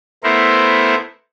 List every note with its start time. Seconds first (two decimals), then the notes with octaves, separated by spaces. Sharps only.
0.24 A3 B3 E4 A#4 C5